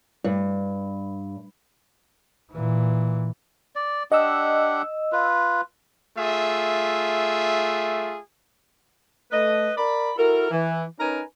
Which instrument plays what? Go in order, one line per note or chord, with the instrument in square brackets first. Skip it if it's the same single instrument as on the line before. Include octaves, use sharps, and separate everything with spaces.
[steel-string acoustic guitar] G2
[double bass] A#2 E3
[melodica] D5
[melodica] D4 G4 F#5 [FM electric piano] D#5 E6
[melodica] F4 B4
[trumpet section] A3 F4 G#4 E5
[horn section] A3 B4 D#5
A#4 D5 B5
E4 F#4 A4 A#4
E3
C#4 D#4 A#4 B4 G#5 A#5